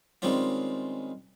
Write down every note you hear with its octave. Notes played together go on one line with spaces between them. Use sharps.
D#3 G3 G#3 C4 C#4 F4